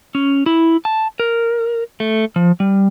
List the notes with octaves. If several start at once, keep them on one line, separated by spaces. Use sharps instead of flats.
C#4
E4
A5
A#4
A3
F3
G3